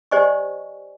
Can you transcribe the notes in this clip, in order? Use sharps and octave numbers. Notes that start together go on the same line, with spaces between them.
G4 C5 D5 D#5 G#5 C#6